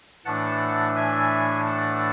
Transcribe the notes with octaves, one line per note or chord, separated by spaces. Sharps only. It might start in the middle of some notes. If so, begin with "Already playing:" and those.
A2 E3 A3 D4 F#5 A5
E5 G#5
F#5 A5